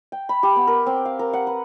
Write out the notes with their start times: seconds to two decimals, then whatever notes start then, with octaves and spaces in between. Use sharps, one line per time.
0.12 G5
0.29 B5
0.43 G4
0.56 B3
0.67 A#4
0.86 C4
1.05 F5
1.19 A#4
1.33 F#5
1.47 B4